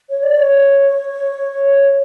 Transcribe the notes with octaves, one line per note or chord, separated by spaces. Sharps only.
C#5
D5
C#5